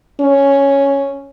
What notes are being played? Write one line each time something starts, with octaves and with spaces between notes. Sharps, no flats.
C#4